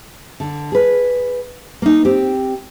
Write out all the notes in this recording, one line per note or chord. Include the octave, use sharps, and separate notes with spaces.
D3
G#4 B4
A#3 D#4
C4 G4